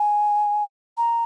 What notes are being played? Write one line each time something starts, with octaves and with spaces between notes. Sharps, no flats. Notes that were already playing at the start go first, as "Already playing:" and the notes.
Already playing: G#5
A#5